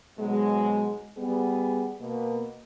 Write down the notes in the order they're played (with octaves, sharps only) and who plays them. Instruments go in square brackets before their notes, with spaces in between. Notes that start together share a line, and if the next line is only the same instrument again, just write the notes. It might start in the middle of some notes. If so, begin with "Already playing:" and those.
[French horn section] G#2 B2 F#3 G#3
G3 B3 G#4
B2 A#3